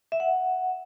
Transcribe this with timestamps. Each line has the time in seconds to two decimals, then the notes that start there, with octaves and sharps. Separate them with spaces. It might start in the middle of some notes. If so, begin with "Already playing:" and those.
0.12 E5
0.20 F#5